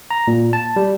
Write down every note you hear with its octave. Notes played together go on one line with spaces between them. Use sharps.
A#5
A#2
A5
G3